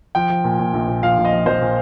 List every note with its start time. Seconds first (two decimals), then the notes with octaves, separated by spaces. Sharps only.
0.15 F3 G5
0.30 F3
0.44 A#2
0.59 A#2
0.73 A#1
0.88 A#2
1.03 F3 F5
1.17 A#1
1.25 D#5
1.33 F3
1.46 F3 C5
1.61 A#2